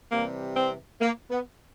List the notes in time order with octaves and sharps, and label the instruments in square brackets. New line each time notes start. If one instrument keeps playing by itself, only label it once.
[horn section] C3 E3 G3 A#3
C4
A#3
B3